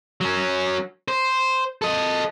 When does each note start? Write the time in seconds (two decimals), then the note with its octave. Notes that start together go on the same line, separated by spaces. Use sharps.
0.21 F#3 C#4
1.08 C5
1.82 A4 D#5